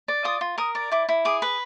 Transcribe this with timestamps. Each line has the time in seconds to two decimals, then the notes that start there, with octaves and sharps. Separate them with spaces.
0.08 D5
0.24 F4 D#6
0.41 F4
0.58 A#4 D#6
0.75 D5
0.91 E4 D6
1.09 E4
1.25 G#4 D6
1.42 B4